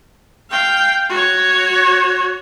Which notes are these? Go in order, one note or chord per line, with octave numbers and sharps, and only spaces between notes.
F5 G5
F#4 C#5